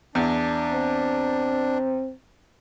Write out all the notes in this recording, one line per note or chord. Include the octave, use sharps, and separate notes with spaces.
E2 D4
C4